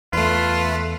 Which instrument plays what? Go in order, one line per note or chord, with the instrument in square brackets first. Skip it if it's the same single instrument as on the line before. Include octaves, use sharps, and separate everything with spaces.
[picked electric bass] E2 [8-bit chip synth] A3 B4 [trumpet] F4